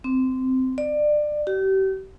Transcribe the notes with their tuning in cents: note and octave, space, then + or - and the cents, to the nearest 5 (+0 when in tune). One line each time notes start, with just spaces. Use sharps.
C4 -15
D5 +25
G4 -35